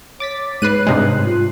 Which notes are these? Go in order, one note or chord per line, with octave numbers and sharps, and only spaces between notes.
C#5 D6 A6 B6
G#2 B4 F#6 C7 D#7
G2 C3 G#3
F4